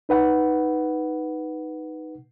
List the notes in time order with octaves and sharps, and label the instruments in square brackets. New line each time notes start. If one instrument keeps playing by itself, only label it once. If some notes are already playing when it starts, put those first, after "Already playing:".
[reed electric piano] D#4 B4 F#5